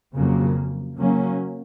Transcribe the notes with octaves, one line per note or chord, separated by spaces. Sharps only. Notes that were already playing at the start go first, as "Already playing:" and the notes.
F2 C#3 F#3 A#3
C#3 F#3 A#3 C#4